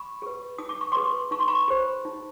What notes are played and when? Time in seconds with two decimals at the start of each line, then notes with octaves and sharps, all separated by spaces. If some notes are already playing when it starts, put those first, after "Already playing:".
Already playing: B5 C#6
0.22 G#4 B4
0.58 D#4 D#6
0.69 D6
0.81 C#6
0.92 G#4 B4 C6 D6
1.31 D#4 C#6
1.40 C6
1.48 B5 C#6
1.68 G#4 C5
2.05 D#4